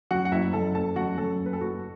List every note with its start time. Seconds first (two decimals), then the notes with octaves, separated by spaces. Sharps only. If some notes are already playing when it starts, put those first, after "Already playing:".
0.11 F#2 F#4 F#5
0.25 F#5
0.32 F#1 E4 E5
0.53 F#2 A4 A5
0.75 F#1 A4 A5
0.96 F#2 F#4 F#5
1.17 F#2 A4
1.39 F#1
1.46 B4
1.53 A4
1.61 F#1 F#4